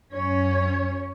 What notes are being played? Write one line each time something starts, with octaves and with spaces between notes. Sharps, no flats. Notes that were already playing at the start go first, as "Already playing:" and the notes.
F#2 C#4 C#5